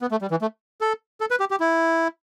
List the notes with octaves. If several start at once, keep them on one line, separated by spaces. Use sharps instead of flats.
B3
A3
G3
E3
A3
A4
A4
B4
G4
G4
E4